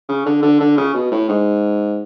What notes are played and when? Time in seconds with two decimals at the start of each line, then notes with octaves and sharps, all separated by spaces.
0.09 C#3
0.26 D3
0.42 D3
0.60 D3
0.77 C#3
0.94 B2
1.11 A2
1.29 G#2